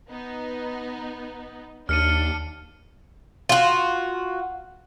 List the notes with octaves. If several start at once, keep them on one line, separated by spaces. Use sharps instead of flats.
B3 D#4
D#2 D4 F6 C#7 D#7
F4 F#4